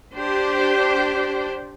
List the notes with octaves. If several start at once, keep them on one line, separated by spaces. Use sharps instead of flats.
D4 G4 C5